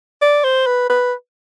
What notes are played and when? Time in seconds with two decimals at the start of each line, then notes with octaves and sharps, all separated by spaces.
0.22 D5
0.44 C5
0.67 B4
0.90 B4